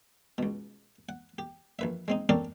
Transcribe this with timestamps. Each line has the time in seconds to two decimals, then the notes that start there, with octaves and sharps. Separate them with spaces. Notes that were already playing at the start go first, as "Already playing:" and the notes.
0.38 C#2 B2
1.09 F#5
1.38 G4
1.79 A#1 B4 E5
2.08 G#3 C4 D#4
2.29 C4 C#4 G4 A4 A#4 D5